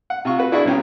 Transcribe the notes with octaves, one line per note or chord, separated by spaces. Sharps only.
F#5
C3 F4 C#6
F#4 B4
D4 E4 F#4 G#4 D5 C#6
B1 C#4 G5